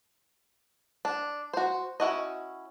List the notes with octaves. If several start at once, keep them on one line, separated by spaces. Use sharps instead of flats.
D4
F#4 C5
C#4 E4 F#4 D#5